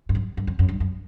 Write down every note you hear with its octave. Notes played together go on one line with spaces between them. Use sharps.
G2
F#2
G2
F2
F#2
G2
F#2